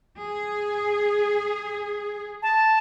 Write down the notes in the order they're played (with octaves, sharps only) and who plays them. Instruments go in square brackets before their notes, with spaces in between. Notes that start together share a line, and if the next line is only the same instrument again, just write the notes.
[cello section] G#4
[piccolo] A5